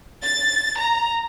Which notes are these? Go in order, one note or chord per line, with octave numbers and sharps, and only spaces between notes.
A6
A#5